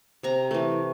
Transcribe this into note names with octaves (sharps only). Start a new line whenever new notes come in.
C3 A#5
E3 A3